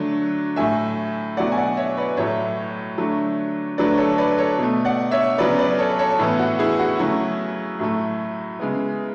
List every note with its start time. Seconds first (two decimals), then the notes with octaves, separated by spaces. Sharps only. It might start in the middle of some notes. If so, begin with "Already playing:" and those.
Already playing: D3 F#3 A3
0.56 A2 F#3 A3 E5 G#5
1.37 B2 F#3 A3 D5 F#5
1.52 G#5
1.57 D5 F#5
1.77 C#5 E5
1.97 B4 D5
2.17 A2 F#3 A3 C#5 E5
2.98 D3 F#3 A3
3.78 D3 F#3 A3 B4 D5
3.98 A4 C#5
4.18 B4 D5
4.38 A4 C#5
4.59 B2 A3
4.85 D5 F#5
5.11 C#5 E5
5.38 C#3 F#3 B3 B4 D5
5.59 B4 D5
5.79 A4 C#5
5.99 A4 C#5
6.19 A2 E3 B3 E4
6.39 F#4
6.59 E4 G#4
6.79 F#4
6.99 C#3 F#3 A3 E4
7.79 A2 F#3 A3
8.60 C#3 G#3 B3